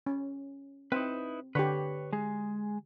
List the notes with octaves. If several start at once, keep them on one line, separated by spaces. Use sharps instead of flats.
C#4
C4 D#4 E4 B4
D3 G4 B4 C#5
G#3 G#4